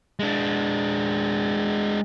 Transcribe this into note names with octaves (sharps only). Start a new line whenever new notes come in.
G#3 D4